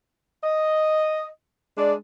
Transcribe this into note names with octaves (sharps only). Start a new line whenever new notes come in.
D#5
G#3 D4 D5